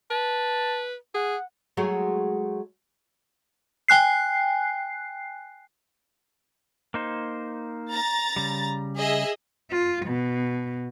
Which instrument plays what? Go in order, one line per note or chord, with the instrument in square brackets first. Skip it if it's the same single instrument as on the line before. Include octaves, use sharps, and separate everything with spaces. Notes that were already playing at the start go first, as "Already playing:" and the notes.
[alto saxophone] B4 [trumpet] A5
[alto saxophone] G#4 [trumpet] F#5
[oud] F#3 G#3 A3
[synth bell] G5 G#5 F#6 C7
[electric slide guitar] A#3 D#4 C5
[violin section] A#5 A6
[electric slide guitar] C#3 G3
[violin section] G#4 D#5 E5
[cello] F4
B2